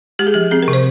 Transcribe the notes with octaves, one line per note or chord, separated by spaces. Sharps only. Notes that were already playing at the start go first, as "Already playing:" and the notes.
G#3 G4
G#4
F3 G4
C4 G#4
A#4
C3
C5